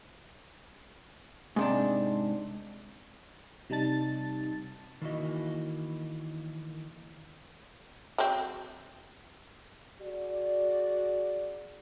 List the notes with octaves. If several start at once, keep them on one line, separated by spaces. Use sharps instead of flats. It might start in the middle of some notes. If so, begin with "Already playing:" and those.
G#2 C3 D4
C3 G3 D#4 A5 A6
D#3 E3 A#3 E4 F#4 D#5
F#3 G#3 C4
F#4 G#4 D5